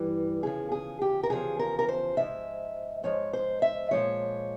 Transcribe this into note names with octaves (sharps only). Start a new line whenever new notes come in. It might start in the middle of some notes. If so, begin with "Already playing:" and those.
Already playing: G2 E3 G3
E2 C#3 F3 G#4
G#4
G4
A#4
E2 C#3 F3 G#4
A#4
A#4
C5
G#2 F3 G#3 E5
G#2 F3 G#3 C#5
C5
E5
A#2 F3 G#3 C#5